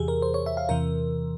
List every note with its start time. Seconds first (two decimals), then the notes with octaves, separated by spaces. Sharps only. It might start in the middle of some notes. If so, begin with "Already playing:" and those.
Already playing: E2 C3 E3 G4 G#4
0.08 A#4
0.22 C5
0.34 C#5
0.46 E5
0.57 F5
0.69 E2 C3 E3 A#4